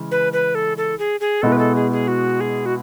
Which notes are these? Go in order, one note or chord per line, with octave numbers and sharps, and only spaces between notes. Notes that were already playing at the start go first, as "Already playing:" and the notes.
Already playing: C#3 E3 G#3
B4
B4
A4
A4
G#4
G#4
B2 G#3 B3 E4 A4
B4
A4
G#4
G#4
F#4
G#4
F#4